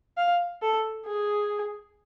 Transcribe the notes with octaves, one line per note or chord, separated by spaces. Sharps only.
F5
A4
G#4